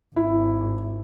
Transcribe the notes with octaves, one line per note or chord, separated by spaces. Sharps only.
G#1 E4